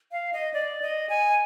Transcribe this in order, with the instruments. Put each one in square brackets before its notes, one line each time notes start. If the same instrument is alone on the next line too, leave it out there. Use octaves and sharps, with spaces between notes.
[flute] F5
D#5
D5
D#5
G#5